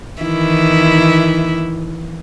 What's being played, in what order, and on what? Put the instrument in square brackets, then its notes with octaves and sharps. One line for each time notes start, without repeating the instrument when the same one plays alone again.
[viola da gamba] D#3 E3 E4